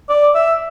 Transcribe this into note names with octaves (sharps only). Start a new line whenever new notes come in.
D5
E5